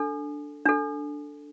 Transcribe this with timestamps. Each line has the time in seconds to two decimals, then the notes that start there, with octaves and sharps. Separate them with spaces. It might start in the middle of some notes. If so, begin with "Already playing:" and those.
Already playing: D4 A4
0.66 D4 A4